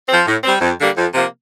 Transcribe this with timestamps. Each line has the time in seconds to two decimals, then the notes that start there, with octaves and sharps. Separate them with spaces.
0.09 F3 C4
0.27 A2
0.44 G3 C4
0.61 F2
0.79 D3 G3 A#3
0.97 F2
1.14 C3 F3 A#3